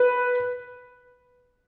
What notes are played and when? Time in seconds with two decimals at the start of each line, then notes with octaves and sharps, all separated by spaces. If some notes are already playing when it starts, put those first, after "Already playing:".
Already playing: B4